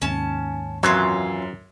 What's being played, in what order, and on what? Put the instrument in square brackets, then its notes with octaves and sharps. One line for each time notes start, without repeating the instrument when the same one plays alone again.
[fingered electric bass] D#2 G#2 [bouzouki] C#4 A5
[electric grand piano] F#2 [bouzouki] E3 C4 F4 [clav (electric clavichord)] F#3